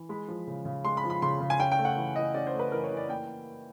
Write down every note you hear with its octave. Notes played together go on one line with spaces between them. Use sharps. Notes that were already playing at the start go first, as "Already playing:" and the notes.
Already playing: E3
G#3 B5
F3
C#3
C#3
G#3 C6
B5
F3
B5
C#3 C6
C#3
G#5
C#4 G5
G5
A3
F#5
E3
E3 D#5
C#4 D5
C5
A3
B4
E3 A#4
C#5
E3
D5
A#3 G5